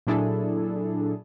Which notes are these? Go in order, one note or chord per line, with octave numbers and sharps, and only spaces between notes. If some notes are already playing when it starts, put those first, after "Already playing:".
A#2 F#3 D4 E4 G#4 A4